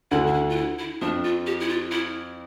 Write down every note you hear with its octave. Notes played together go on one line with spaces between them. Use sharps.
D2 D3 E4
D4
E4
F4
E4
E4
F2 F3 D4
F4
G4
E4
F4
E4